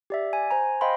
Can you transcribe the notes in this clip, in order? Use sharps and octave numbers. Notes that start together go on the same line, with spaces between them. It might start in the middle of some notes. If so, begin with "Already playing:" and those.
G4 D5 E5
G#5
C5 G#5 A#5
C5 D#5 F5 G5 B5 C6